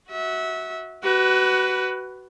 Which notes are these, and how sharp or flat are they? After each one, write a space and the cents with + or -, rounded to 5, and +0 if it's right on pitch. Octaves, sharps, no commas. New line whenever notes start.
F#4 +0 E5 -25
F#4 +25 B4 +5